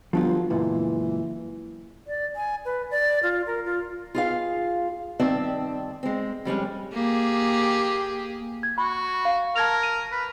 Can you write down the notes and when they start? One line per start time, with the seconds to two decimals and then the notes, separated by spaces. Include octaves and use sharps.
0.13 G1 F3 F#3 F4
0.50 C#2 F#2 A#2 E3
2.07 D5
2.36 G#5
2.65 B4
2.91 D5
3.23 F4
3.47 A#4
3.65 F4
4.15 F4 G#4 F5
5.20 G2 D#3 C4 D5 E5 A5
6.03 G#3 C4
6.45 F2 G3 G#3 C#4
6.93 A#3 G4 G#4
8.63 G#6
8.78 F#4 B5
9.25 F5
9.56 A#4 A5 G#6 F7
9.83 D#7
10.12 B4